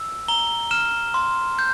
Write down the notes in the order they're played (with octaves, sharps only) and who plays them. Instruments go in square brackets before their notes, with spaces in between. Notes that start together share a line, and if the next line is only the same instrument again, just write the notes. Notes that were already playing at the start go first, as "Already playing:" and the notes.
Already playing: [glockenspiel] E6
A#5 G7
F6 E7
C6
G6